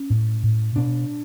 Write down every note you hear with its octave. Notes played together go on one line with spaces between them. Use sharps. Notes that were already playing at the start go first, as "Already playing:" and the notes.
Already playing: C#4
A2
A2
B2 D4